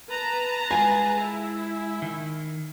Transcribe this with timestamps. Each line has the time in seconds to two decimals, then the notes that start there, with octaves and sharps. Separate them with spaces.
0.10 B4 A5 A#5
0.71 G#3 F4 G#4 G#5
1.20 E4
2.02 D#3